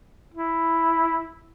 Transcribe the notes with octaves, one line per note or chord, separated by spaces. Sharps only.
E4